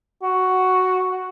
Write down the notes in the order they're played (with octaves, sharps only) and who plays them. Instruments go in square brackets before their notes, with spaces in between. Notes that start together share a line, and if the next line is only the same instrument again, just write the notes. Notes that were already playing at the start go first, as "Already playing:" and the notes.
[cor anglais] F#4